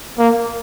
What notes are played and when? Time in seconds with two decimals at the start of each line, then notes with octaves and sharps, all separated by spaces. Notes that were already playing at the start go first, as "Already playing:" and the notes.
0.19 A#3